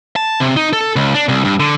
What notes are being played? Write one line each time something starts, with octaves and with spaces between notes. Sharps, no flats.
A5
C3
D#4
A4
C#2
D4
C2
G2
D3